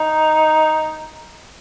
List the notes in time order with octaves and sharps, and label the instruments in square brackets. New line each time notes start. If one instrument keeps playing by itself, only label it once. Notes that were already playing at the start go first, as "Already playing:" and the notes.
Already playing: [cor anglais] D#4